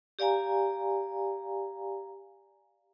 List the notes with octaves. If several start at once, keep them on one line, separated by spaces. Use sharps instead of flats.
G4 D5 F5 G#5 A#5